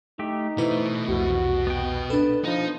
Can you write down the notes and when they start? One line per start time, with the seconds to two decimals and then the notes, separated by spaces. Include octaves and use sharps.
0.19 A3 D#4 G4
0.58 B2 E3 A3 E4 B4 C5
1.09 C2 F2 F#4
1.67 B3 G5
2.10 D4 A4 B4
2.44 F3 D#4